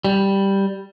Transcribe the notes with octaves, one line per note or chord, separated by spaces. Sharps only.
G3